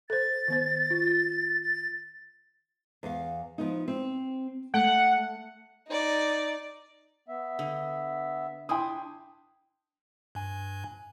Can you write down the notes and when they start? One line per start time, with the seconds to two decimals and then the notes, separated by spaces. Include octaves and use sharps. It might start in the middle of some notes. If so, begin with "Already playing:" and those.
0.10 A4 C5 A6
0.48 D#3 B3 C5
0.90 F4
1.62 A6
3.03 E2 F5
3.58 F3 B3 D#4
3.88 C4
4.74 A3 F#5
5.88 D#4 D5
7.28 B3 E5
7.59 D3
8.69 D4 E4 G5 C6 D#6
10.35 G2 G#5